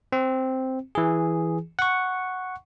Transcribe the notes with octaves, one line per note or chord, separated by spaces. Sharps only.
C4
E3 G#4
F#5 C#6